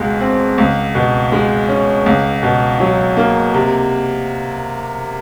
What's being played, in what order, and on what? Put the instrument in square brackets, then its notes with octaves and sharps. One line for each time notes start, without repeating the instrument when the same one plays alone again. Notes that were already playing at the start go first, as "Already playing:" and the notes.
Already playing: [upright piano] C#2 B2 G#3
C4
C#2
B2
G#3
C#4
C#2
B2
F#3
A#3
C3